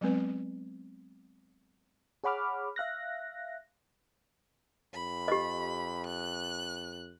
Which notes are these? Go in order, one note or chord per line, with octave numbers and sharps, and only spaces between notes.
F#3 G#3 B3 C4 B4
G#4 C#5 F#5 B5 D6 F6
E5 F5 F#6 A#6
F2 B5
G4 D#5
F#6